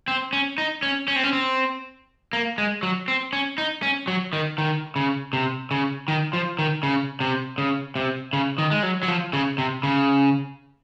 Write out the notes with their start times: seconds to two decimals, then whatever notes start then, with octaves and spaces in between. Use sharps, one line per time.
0.08 C4
0.33 C#4
0.58 D#4
0.83 C#4
1.08 C#4
1.16 C4
1.24 C#4
1.33 C4
2.33 A#3
2.58 G#3
2.83 F#3
3.08 C4
3.33 C#4
3.58 D#4
3.83 C#4
4.08 F#3
4.33 D#3
4.58 D#3
4.96 C#3
5.33 C3
5.71 C#3
6.08 D#3
6.33 F3
6.59 D#3
6.83 C#3
7.20 C3
7.58 C#3
7.96 C3
8.33 C#3
8.58 D#3
8.71 G#3
8.83 F#3
9.03 F#3
9.08 F3
9.33 C#3
9.58 C3
9.83 C#3